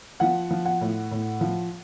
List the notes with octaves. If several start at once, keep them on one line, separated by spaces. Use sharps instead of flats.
F3 F#5
F3
F#5
A2
A2
F3